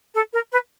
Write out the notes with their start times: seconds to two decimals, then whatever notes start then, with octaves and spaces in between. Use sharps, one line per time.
0.14 A4
0.33 A#4
0.51 B4